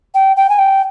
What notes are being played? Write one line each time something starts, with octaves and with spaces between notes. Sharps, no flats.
G5
G5
G#5
G5